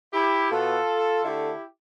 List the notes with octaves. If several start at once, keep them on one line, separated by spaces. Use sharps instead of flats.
E4 G4
B2 B3 F4 A4
D3 A3 E4 G4